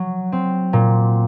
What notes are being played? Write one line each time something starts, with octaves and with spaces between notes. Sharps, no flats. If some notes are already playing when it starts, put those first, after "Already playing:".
Already playing: F#3
C4
A#2